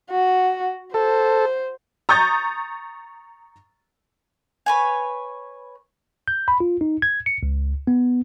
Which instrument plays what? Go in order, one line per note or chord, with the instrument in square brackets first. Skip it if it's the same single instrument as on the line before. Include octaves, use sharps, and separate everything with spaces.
[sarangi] F#4
[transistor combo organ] A4 [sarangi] C5
[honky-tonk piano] A#5 C#6 D#6 G6 A6
[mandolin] B4 C#5 G#5
[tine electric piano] G6
B5
F4
D#4
G#6
C#7
C#2
B3